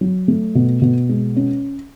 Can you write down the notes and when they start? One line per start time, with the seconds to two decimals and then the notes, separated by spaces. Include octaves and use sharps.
0.01 F#3
0.28 A3
0.55 B2
0.82 B2
1.09 G#3
1.36 C#4